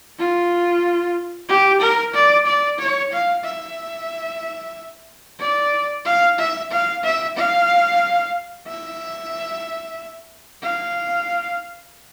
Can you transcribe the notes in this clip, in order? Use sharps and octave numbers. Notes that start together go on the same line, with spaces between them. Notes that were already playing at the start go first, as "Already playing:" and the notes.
F4
G4
A#4
D5
D5
C#5
F5
E5
D5
F5
E5
F5
E5
F5
E5
F5